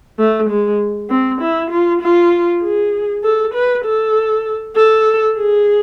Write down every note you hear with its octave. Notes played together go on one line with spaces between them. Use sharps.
A3
G#3
C4
E4
F4
F4
G#4
A4
B4
A4
A4
G#4